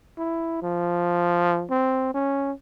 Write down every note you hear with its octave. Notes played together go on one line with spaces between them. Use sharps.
E4
F3
C4
C#4